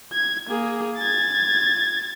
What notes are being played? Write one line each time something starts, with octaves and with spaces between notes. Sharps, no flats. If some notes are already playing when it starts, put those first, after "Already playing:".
G#6
A#3 G#4
G#6 A6